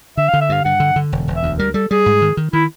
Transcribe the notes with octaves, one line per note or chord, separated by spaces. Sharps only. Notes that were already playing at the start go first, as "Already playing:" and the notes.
D3 E5
F5
D3
E5
G2 F5
G2 F#5
D3
D3
E1
E1
E5
D2
G3 A#4
G3 A4
G3 G#4
G#2
D#3
D#3
D#3 E4